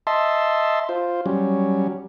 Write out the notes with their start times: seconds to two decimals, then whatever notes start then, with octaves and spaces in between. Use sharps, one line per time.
0.07 D#5 E5 A5 C6
0.89 F4 C5
1.26 F#3 G3 C#4